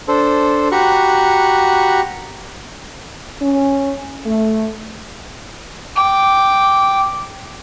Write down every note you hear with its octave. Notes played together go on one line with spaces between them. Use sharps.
D4 A4 C5
F#4 G4 A#5 B5 C#6 F#6
C#4
A3
G5 D6